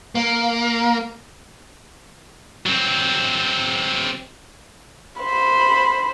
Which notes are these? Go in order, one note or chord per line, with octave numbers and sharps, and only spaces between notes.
A#3
F#3 C4
C5 B5